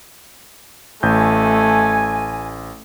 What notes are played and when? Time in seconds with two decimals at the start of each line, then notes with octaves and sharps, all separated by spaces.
1.03 A1 A3 G#5 G6